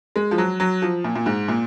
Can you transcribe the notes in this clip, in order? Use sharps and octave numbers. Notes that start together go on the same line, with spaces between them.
G#3
F3
F#3
F#3
F3
A#2
A#2
G#2
A#2